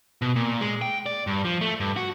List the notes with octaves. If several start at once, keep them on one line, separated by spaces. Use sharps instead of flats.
B2
A#2
G#3
G5
D5
G2
F3
A3
G2
F#4